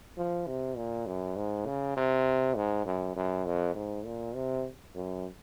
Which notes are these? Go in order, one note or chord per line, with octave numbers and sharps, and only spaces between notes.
F3
C3
A#2
F#2
G#2
C#3
C3
G#2
F#2
F#2
F2
G#2
A#2
C3
F#2